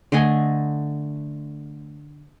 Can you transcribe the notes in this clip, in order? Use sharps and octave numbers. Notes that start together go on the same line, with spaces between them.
D3 A3 D#5 G#5